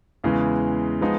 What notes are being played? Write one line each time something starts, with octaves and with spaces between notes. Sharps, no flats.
E2 C#3 E3 G#3
F3 G#3 B3 D#4